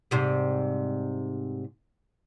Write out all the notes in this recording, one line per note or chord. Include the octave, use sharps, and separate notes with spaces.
G#2 C3 G3